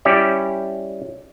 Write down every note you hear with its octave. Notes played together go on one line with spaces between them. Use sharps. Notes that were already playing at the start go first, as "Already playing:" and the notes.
G3 C#4 E4 G4 D5